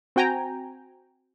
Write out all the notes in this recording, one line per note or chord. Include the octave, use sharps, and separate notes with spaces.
C4 F#4 G5 G#5 A#5